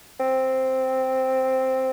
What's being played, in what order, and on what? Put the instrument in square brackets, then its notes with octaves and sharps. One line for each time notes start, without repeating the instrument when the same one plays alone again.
[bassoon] C4